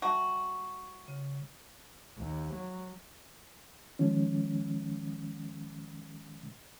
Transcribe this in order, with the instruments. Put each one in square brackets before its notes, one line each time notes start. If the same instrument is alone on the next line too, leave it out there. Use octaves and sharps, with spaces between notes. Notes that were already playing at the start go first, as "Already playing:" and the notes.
[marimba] G3 E5 A5 [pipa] F#4
[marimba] C#3
[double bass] D#2
F#3
[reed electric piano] D#3 F3 G#3 C#4